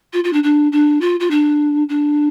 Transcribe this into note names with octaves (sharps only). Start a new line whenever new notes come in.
F4
F4
D4
D4
D4
F4
F4
D4
D4